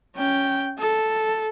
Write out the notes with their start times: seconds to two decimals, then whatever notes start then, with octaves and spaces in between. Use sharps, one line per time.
0.16 C#4 G5
0.79 A4